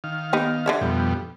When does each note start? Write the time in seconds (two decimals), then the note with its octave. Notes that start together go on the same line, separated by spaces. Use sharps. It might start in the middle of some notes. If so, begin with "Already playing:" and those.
0.04 D#3 F5
0.33 B3 D#4 G4
0.66 D3 C#5 E5
0.81 F2 B2 G3